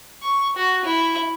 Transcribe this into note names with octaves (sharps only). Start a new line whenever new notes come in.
C#6
F#4
E4